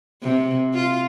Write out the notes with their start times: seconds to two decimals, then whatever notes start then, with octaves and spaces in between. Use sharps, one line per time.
0.23 C3
0.74 F4